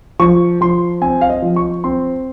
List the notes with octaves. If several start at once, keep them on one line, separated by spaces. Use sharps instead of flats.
F3 C#6
F3 C6
C4 G#5
F5
D#5
F3
C#6
C4 C6